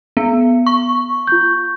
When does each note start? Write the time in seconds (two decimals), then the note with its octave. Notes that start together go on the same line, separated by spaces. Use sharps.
0.17 B3
0.66 C#6
1.27 F4 G6